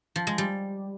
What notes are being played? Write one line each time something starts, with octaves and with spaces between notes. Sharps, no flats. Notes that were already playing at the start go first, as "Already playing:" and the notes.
F3
G#3
G3